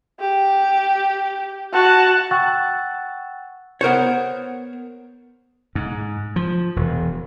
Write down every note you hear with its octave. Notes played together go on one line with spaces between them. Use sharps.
G4
F#4 A5
F#5 G5 C#6 E6 F#6 A6
B3 A#4 C5 C#5
G#2
F3
E1